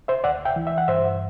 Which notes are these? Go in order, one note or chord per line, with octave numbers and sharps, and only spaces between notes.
C5 E5
D2 D5 F#5
E5 G5
E3
E5
F#5
G2 C5 E5